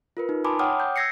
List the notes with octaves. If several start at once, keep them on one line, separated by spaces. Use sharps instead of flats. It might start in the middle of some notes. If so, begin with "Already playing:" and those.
F4 A#4 B4
D#4
G#5 A5 B5 C6 D6 D#6
C#5 F#5 G5 D6 D#6 F6
G6
E6 G6 G#6 A#6 C7 C#7